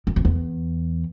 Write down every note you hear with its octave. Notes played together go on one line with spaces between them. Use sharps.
F#2
F2
E2